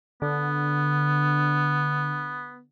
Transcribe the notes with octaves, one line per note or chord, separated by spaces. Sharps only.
D3 B3